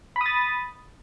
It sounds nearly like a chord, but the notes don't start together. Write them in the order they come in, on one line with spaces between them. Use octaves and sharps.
B5 D#6 A6